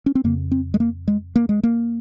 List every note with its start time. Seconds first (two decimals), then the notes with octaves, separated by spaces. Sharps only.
0.06 C#4
0.15 C4
0.24 F2 C#3 A#3
0.51 C4
0.74 G#3
0.80 A#3
1.08 G#3
1.36 A#3
1.49 G#3
1.63 A#3